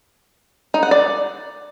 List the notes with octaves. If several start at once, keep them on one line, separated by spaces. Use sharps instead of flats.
D#4
F#5
D5